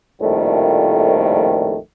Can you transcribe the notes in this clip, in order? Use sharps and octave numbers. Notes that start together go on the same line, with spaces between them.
A#1 F2 A2 D#3 G3 A3